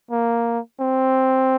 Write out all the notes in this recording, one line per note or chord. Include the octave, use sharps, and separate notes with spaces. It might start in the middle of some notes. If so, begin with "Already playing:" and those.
A#3
C4